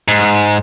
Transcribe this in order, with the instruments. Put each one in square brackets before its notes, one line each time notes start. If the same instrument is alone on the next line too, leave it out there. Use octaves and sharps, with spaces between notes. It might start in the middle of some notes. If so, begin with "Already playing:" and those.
[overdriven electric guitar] G#2